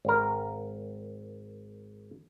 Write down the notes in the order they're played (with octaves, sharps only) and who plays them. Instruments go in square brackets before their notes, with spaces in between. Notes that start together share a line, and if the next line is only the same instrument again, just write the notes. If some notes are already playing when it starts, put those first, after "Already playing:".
[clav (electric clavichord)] G#1 A#4